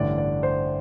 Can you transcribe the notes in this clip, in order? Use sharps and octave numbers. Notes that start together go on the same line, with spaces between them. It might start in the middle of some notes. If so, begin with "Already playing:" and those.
Already playing: A1 G2 D3 D5
D5
C5